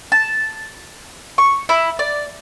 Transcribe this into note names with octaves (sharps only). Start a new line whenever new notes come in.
A5
C#6
E4
D5